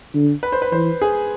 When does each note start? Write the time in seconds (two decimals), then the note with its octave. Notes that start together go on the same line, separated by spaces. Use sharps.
0.14 D3
0.43 B4
0.52 C5
0.62 B4
0.72 E3 C5
1.02 G#4